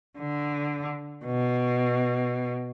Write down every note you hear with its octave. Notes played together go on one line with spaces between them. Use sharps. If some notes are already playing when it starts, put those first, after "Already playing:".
D3
B2